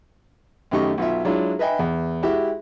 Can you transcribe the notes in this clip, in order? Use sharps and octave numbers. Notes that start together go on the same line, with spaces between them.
F#2 D#3 A3 G4 D#5 C#6
B1 F4 E5
F#3 G#3 D4 E4 F4
B4 D#5 E5 G5 G#5 B5
E2
G#3 E4 F#4 G4 E5